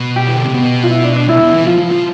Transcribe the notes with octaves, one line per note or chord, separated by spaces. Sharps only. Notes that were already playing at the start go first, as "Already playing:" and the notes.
Already playing: B2
G4
E3
D3
C3
B2
F4
E4
D4
D4
A2 E4
C3
B2
D3
E3
F3 F4
F3
F3